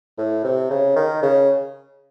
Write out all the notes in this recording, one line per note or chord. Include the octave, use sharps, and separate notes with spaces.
A2
C3
C#3
D#3
C#3